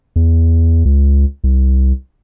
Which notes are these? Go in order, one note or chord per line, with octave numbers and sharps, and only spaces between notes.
E2
C#2
C2